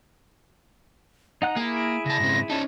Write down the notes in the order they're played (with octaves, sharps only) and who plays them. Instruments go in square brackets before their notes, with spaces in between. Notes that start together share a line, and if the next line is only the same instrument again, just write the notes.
[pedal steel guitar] D#4 F#5 F#6 [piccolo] A#5
[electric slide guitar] A#3 [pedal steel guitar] E4 G#4
[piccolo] D7
[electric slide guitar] C#3 A5 [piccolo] A#6
[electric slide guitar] G#2 C#3 C4
[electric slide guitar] C#4 D#4 [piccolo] A5